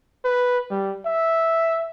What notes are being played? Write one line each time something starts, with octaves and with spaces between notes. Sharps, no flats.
B4
G3
E5